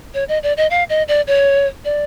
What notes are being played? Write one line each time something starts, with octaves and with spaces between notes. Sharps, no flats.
C#5
D#5
D5
D#5
F5
D#5
D5
C#5
D5